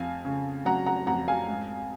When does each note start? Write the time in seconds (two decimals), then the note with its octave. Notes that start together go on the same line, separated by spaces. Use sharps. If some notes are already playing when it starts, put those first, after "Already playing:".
Already playing: F2 F5 G#5
0.25 C#3
0.65 F#3 F#5 A#5
0.86 F#5 A#5
1.07 F2 F#5 A#5
1.28 F5 G#5
1.48 G#2